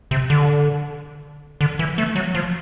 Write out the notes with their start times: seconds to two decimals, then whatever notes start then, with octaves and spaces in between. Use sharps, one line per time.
0.11 C3
0.30 D3
1.61 D3
1.79 E3
1.98 A3
2.16 F#3
2.35 F3